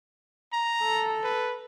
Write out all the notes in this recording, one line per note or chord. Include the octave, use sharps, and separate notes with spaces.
A#5
A4
B4